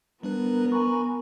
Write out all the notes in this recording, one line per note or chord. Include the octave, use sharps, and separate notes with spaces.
G3 B3 D4 A#4 B4
G#5 B5 C#6